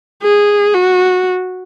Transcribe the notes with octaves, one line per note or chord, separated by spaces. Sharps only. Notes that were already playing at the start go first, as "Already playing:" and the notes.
G#4
F#4